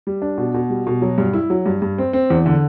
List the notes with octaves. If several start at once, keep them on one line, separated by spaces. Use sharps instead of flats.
G3
D4
B2
B2
G3
B2
F#3
G2
E4
F#3
G2
G2
C4
C4
E2
D3